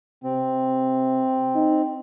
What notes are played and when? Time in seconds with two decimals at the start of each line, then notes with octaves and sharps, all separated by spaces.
0.24 C3 C4
1.55 D#4